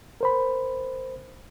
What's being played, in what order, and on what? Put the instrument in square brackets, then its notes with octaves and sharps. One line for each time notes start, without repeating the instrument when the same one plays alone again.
[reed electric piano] A#4 C5 B5